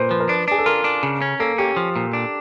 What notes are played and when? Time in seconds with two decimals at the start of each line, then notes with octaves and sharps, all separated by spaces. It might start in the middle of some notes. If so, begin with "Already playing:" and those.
Already playing: A#2 B4 C5
0.11 F3 B4
0.20 A#4
0.29 D4 B4
0.48 D4 G#4
0.59 A4
0.66 F4 A#4
0.84 D4
1.03 C#3
1.22 C#4
1.40 A#3 A4
1.58 C#4 G4
1.77 F3
1.96 A#2
2.13 D4